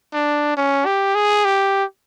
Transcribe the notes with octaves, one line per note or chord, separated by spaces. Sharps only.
D4
C#4
G4
G#4
G4